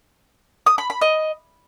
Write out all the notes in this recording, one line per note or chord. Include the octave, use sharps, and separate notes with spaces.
D#6
B5
B5
D#5